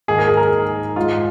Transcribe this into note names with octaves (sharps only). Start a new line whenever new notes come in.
G#2 D#3 A#3 G#4
A#4
G#4
A#4
G#4
G#2 G#3 F4